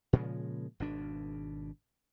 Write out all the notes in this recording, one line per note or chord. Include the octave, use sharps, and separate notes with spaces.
A#2 C#3 F3 G#3
G#1 B2 D4